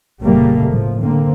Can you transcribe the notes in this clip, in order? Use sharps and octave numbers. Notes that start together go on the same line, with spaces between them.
F1 A#2 C#3 G3 A3 A#3
A2 F3
D3 A#3 C4